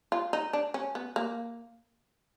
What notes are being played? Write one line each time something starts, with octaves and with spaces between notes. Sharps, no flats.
F4
D#4
D4
C#4
B3
A#3